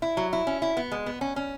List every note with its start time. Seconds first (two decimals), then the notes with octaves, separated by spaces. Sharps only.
0.02 E4
0.17 F#3
0.33 E4
0.47 C#4
0.62 E4
0.77 B3
0.92 G#3
1.06 B3
1.21 C#4
1.36 C#4